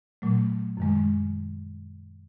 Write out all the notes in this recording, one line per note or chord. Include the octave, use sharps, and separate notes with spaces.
A#2 F#3 A3
F#2 D#3 G#3